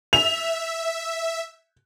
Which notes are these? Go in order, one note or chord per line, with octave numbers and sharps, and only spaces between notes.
E5 F7